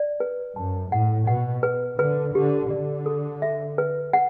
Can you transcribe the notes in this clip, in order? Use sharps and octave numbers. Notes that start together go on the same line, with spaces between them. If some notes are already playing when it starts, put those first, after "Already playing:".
Already playing: D5
B4
F#2 A5
A2 F#5
B2 F#5
B4
D3 B4
D3 G4
D3 D5
A4
E5
B4
F#5